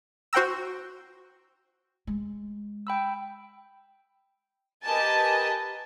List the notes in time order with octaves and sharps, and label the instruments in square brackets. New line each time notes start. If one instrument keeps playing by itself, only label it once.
[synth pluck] F#4 C5 F#5 G5 A#5 E6
[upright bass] G#3
[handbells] G5 B5 E6
[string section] G4 A#4 B4 D#5 G#5 A5